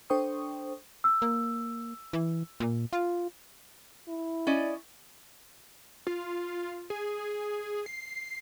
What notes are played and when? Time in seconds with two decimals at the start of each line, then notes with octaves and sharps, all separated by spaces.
0.10 D4 A4 C5 G5 C#6 D#6
1.04 E6
1.22 A#3
2.13 E3
2.60 A#2
2.93 F4
4.08 E4
4.47 C#4 D5 D#5
6.07 F4
6.90 G#4
7.86 C7